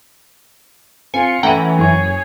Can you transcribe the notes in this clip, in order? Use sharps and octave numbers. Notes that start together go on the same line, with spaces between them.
C4 F4 G#5 C#7
E3 A3 C#4 B4 F#5 G5 A#5 D#7
F#1 G#4 C#5 C#6